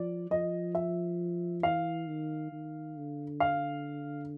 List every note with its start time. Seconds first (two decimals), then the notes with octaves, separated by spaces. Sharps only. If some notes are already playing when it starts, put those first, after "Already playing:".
Already playing: F3 D5
0.31 F3 D#5
0.75 E5
1.63 E3 F5
2.07 D#3
2.52 D#3
2.97 D3
3.40 F5